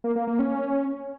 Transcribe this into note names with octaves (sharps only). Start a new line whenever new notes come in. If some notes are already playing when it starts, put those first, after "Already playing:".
A#3
A#3
A#3
C#4